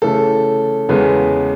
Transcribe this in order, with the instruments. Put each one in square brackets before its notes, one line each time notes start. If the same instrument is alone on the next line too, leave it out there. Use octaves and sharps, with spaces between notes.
[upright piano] C#3 E3 A3 A4
E2 C#3 G#3 B3